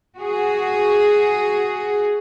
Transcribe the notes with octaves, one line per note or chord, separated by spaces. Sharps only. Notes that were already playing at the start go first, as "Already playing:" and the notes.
F#4 G#4